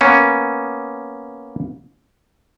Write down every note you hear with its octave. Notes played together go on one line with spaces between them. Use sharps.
A#3 B3 C#4